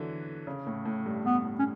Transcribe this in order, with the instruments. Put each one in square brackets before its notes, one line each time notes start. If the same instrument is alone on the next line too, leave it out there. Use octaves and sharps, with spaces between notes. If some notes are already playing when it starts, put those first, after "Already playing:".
Already playing: [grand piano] D3 E3 F#3
C#3
A2
A2
G2
[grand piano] G2 [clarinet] B3
[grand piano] A2
[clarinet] C#4